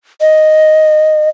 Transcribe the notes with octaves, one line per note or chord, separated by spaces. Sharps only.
D#5